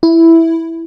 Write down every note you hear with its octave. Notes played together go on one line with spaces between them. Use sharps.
E4